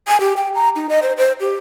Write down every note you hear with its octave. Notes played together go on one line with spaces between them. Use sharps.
G#5
G4
G5
A#5
D#4
D#5
C5
C5
G4